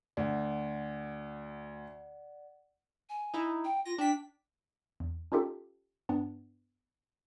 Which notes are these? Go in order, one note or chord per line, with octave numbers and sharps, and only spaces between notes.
D2 D5 F#5
G#5
D#4 E4
G5
F4 A#6
D4 G5 B6
E2
C#4 D#4 F4 G4 A4
G2 B3 D4